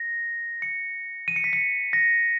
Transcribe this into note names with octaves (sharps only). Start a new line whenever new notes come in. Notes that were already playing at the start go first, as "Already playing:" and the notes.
Already playing: A#6
C#7
D#7
C#7
B6
C#7
A#6